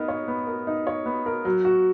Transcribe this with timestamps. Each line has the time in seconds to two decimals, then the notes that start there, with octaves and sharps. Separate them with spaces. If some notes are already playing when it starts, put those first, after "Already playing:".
Already playing: B3 D#4 A#4
0.08 C#5
0.28 B3
0.47 A#4
0.67 D#4
0.87 C#5
1.06 B3
1.26 A#4
1.45 F#3
1.65 F#4